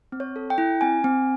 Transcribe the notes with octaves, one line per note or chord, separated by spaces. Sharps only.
C4
C#5
A4
G5
E4
C4 G#5
C4